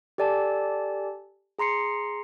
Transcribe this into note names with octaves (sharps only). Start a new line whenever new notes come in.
G4 A4 D5 G#5 A5
G#4 A#5 C6 C7 C#7